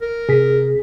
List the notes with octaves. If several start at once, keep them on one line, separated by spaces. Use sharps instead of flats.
A#4
C3 G#4 B6